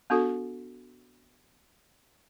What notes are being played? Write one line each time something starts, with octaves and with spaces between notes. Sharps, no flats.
B3 D4 F#4 A4